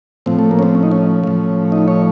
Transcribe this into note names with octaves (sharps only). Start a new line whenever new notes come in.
A2 F3 C4
A3
A#3
C#4
C4
C#4
D#4
C#4
A2 F3
D#4
C#5